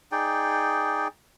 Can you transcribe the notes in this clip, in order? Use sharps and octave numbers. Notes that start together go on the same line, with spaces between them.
D#4 G#4 D5 G5